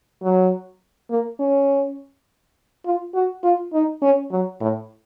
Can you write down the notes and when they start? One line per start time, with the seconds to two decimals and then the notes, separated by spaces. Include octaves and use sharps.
0.23 F#3
1.10 A#3
1.40 C#4
2.86 F4
3.15 F#4
3.44 F4
3.73 D#4
4.02 C#4
4.32 F#3
4.61 A2